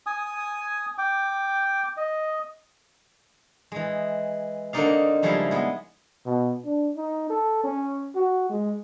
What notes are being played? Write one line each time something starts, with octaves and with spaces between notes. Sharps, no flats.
G#5 D#6
G5 D6
D#5
E3 G#3
D3 A#3 C4 D#4 D5 F5
C#3 F3 G3 G#3 E4 F5
G#3 B3
B2
D4
D#4
A4
C#4
F#4
G#3